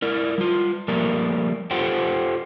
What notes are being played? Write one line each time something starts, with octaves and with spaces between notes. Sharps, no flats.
E4 A#4 D5
G3 F4
F3 G3 A3 A#3 A#4 D5
F4 G4 A4 C5 F#5 G5